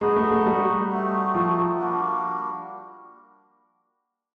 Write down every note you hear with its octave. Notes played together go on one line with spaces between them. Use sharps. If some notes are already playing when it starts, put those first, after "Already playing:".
G#3 D#4 F#4 B4 D#5
A3
A3
G3
A3 C4 D#4 F#4
F3
G3 A#3 D4 F#4